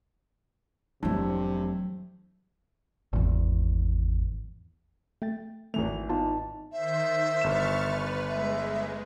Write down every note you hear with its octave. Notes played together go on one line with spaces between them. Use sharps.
F1 A2 C3 E3 F#3 D4
G#1 E2
A3 G5 A6
G#1 E3 A3 F7
B3 D#4 F4 A5
D#3 C5 E5
G1 C#6 F6 A6 E7
B4
G#3 E5